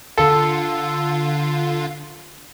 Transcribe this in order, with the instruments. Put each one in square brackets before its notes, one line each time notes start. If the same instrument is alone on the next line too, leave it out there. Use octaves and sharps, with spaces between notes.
[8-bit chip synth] D3 F4 [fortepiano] A4